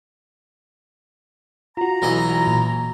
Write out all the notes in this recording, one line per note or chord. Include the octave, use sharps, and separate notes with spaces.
F4 F#4 A#5
B1 E3 D#5
A#2